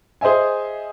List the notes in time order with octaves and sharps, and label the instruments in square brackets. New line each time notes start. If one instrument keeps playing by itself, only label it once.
[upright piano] G#4 C5 D#5 E5 G#5